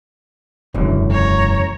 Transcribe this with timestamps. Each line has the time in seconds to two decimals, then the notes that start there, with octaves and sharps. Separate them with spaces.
0.74 E1 C#2 F#2 D3 E3
1.11 C#5 A#5